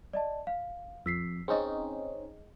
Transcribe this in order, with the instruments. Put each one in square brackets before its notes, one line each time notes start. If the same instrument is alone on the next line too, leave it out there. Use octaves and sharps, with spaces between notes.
[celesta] D5 D#5 A5
F5
[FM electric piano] F2 [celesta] E6 B6 C7
[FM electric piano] C4 C#4 D#4 [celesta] G#4 D#5